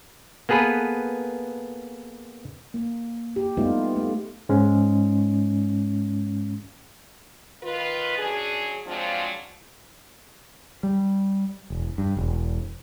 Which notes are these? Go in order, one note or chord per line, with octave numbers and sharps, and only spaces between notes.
A#3 B3 G#4 A4 B4
A#3
G4
G3 A3 B3 D#4 F4
A3
G#2 G#3 C#4
D#3 F4 B4
F#2 F#3 D4 G#4
F3 F#3 G#3 C4 D4 F4
G3
E1
G2
E1